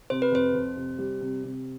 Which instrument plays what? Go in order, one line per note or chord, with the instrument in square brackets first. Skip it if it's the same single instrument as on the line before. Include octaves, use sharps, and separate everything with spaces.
[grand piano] C3 [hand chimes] C5
[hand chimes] B4
[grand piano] F2 [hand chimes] C5
[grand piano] F2
C3
G3
C3
C3